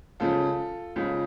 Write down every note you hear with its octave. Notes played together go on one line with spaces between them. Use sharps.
C#2 C#3 F3 F4 A4
C#2 C#3 F3